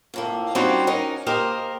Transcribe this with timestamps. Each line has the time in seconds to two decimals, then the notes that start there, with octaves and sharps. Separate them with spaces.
0.14 F2 A2 A#3
0.55 G3 C4 C#4 D#4 F#4 G4
0.87 C#4 D#4 A#4 D#5
1.26 A#3 G4 A#4 C5 D#5